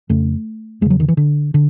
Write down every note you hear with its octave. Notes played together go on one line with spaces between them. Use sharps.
F2 C#3 A3
E2 C#3 F#3 G#3
D#3
E3
D3
D3